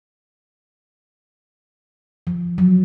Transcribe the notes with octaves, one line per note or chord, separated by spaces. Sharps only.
F3
F#3